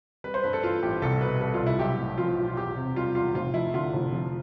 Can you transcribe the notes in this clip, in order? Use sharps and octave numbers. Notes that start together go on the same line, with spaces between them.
G3 B4
C5
G2 B4
A4
E3 F4
A1 G4
C2 A4
B2 B4
G3 A4
F4
C2
E4
B1 G4
A2
F3 F4
B1
F4
E2 G4
C3
G3 F4
E2 F4
F1 F4
F2 E4
D3 F4
F1
F3